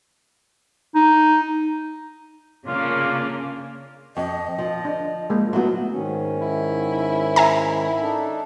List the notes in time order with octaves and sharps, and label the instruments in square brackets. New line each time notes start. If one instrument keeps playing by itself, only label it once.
[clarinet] D#4
[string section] C#3 A#3 [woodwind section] D4 F4
[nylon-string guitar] F2 [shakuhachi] D#5
[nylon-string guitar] F3
[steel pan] D4
G#3 A#3
[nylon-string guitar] F#3 B3 [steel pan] A3 E4 F#4
[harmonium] G#2 D#3 C#4
[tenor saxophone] E4
[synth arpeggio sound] E5 G#5 A#5
[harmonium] D4 D#4 A4